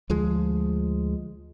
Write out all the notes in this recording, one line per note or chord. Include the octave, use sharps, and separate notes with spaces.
D2 F3 G#3